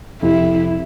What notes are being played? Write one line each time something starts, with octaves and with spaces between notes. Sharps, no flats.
F2 C3 E4